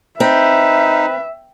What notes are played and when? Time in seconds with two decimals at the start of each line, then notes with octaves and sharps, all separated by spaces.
0.20 C4 D#4 B4 E5